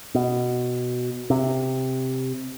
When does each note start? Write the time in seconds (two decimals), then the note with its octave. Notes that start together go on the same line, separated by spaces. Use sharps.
0.15 B2
1.30 C3